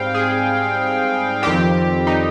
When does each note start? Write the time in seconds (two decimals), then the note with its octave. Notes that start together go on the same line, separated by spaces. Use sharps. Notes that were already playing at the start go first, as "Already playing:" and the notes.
Already playing: G#2 G3 C4 F5 G5
0.14 G#4
1.42 F2 D#3 G3 C4 G4
2.07 D#4